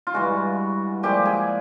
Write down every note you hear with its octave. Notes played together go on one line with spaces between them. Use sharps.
F4
G2 E3 G#3 F#4
A#2 F3 G#3 G4
G#4